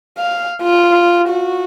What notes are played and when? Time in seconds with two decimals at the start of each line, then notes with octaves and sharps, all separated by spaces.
0.18 F5
0.62 F4
1.28 F#4